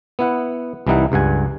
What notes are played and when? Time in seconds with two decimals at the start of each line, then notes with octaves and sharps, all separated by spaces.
0.19 B3 E4 F#5
0.87 C2 E3 G3 D#4 E4 F#5
1.12 C#2 G2 F#5 G#5